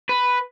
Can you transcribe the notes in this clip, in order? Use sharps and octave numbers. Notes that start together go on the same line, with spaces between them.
B4